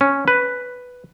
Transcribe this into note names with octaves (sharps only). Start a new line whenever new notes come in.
C#4
B4